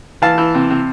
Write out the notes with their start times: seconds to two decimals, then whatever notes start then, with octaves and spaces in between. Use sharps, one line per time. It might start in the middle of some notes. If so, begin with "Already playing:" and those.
0.22 E3 F5 A5
0.38 E3
0.55 C3
0.70 C3